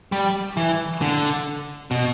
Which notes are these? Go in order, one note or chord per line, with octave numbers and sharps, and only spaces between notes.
G3
E3
D3
B2